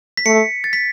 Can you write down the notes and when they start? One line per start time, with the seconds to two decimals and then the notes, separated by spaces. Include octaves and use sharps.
0.17 B6
0.26 A3 C#7
0.64 A6
0.73 B6